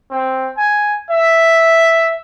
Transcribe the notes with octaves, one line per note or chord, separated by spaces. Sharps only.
C4
G#5
E5